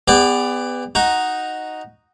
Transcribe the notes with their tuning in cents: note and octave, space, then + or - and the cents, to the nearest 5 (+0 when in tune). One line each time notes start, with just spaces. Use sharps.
B3 +20 G#4 -45 D5 +0
D#4 +0 F#4 +0